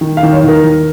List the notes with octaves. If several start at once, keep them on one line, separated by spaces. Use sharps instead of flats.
D#3
F5
D#3
C#5
D#2 A#4
D#2